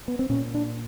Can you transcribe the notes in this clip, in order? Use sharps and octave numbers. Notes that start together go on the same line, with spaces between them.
B3
C4
A#2 C#4
D4